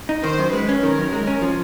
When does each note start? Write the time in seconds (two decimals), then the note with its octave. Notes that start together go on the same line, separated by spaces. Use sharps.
0.09 D#4
0.24 D#3 C5
0.38 F#2
0.53 G#3 B4
0.69 C#4
0.82 D#3 A#4
0.98 F#2
1.13 G#3
1.27 C#4
1.42 F3